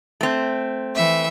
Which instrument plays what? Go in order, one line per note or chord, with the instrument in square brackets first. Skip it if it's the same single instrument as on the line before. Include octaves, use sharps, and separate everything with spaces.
[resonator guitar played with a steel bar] A3 C4
[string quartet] E3 E5